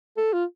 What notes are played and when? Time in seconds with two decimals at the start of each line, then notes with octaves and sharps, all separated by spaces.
0.17 A4
0.33 F4